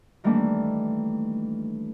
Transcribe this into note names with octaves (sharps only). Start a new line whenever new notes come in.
D#3 E3 G3 A3 A#3 D4